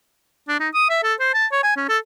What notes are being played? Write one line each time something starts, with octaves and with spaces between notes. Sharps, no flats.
D4
D#4
D#6
E5
A4
C5
A5
C#5
G#5
C#4
A4